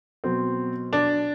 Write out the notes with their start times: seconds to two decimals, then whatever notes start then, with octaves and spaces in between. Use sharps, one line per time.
0.24 B2 F#3 C4
0.93 D4